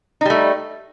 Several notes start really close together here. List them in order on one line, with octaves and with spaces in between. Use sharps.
D#4 G3 A3